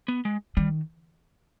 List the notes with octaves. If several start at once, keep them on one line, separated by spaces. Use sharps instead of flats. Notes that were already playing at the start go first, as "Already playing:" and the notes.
B3
G#3
D#3 G3